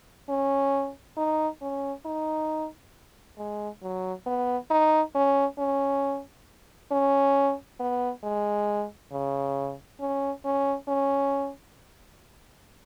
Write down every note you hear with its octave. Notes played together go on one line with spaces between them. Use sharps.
C#4
D#4
C#4
D#4
G#3
F#3
B3
D#4
C#4
C#4
C#4
B3
G#3
C#3
C#4
C#4
C#4